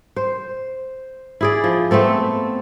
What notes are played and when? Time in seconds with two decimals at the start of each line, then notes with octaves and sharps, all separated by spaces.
0.16 C5
1.41 E4 G#4 D5
1.64 F3
1.91 A3 B3 C4 A4